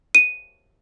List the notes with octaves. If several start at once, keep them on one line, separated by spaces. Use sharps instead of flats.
D#7